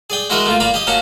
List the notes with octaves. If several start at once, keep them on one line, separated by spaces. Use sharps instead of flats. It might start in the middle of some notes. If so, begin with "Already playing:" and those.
G#4 D5 G5
G#3 E4 F#4 A#4 D#5
A3 A#3 F4
A#3 D5 A#5 B5
G4 D#5
A#3 C#4 F#4 A5 A#5